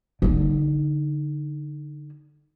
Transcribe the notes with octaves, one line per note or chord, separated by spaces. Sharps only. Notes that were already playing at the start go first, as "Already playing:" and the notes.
D3 D#4